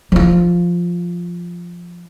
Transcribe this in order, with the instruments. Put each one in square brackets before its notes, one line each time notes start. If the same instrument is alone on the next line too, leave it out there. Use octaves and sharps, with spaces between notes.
[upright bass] F3 F4